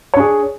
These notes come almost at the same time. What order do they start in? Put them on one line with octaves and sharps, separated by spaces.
C#5 D4 G#4